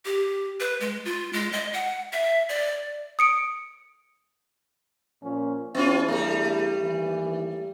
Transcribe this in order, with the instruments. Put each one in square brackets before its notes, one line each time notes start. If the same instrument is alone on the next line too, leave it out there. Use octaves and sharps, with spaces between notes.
[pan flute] G4
B4
G#3
F4
G#3
D#5
F#5
E5
D5
[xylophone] D#6 C#7 D7
[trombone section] A#2 F3 C#4
[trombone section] E2 D4 E4 [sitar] B3 C#4 F4
[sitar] G3 A3
[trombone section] D#2 E3